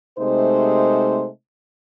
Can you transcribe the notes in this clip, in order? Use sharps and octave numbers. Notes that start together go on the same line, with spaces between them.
C3 G#3 A3 D#4 C5